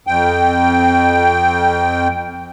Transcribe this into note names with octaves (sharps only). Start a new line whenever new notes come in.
F2 G5